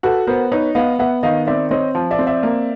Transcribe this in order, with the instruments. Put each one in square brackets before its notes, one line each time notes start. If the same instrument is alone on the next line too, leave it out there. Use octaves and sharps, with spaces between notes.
[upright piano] F#4 [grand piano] A4 B4
[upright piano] B3 [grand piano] A#4 C5
[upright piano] D#4 [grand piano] B4 C#5
[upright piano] B3 [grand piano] D#5 F5
[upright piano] B3 [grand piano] E5 F#5
[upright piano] D#3 [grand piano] D#5 F5
[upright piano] C4 [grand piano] D5 E5
[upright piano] C4 [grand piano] C#5 D#5
[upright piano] F3
[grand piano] D5 E5
[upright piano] C4
[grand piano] D5 E5
[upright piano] A#3